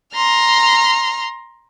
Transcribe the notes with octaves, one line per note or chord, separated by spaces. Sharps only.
A#5 C6 F6